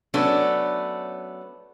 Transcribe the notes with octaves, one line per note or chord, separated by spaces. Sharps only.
F#3 A3 B3 C#4 D4